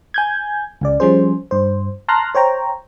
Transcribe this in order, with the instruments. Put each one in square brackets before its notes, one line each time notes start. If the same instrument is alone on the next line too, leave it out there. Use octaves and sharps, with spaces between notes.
[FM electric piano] G#5 G6 G#6
C#2 C#3 D5
F3 G3 C#4 G#4 C5
G2 C5
A5 A#5 C6 F6 F#6 A#6
C5 C#5 G5 A#5